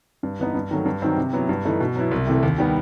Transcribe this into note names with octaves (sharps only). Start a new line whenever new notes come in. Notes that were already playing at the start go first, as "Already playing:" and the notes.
G2
E3 B3 D#4
G2
D#3 F#3 A3
G2
D#3 F#3 C4 D#4
C3
F#3 B3 E4
G2
E3 A3 D#4
B2
F#3 B3 E4
C2
C3 E3 A3
D#2
D#3 G3 B3